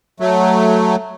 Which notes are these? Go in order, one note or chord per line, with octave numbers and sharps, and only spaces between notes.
F#3 A3